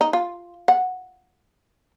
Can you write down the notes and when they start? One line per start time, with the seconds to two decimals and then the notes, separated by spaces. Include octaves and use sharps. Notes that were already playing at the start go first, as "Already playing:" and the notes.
0.01 D#4
0.13 F4
0.68 F#5